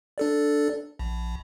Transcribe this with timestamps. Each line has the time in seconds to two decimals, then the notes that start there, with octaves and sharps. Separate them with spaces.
0.18 D4 A4 D5
0.99 A#1